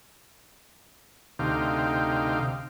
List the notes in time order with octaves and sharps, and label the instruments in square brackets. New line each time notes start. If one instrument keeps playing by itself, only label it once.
[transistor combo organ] D2 C3 D#4 F5 G5